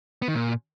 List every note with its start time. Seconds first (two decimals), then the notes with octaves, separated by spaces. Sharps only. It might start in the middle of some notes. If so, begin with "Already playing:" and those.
0.22 B3
0.28 D#3
0.34 A#2